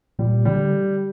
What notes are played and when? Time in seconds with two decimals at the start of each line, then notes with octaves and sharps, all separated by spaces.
0.19 A#2 G3
0.45 D3 G3